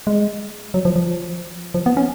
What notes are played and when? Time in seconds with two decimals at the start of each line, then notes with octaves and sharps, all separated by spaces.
0.07 G#3
0.74 F#3
0.85 F3
0.96 F3
1.74 F3
1.86 B3
1.97 C#4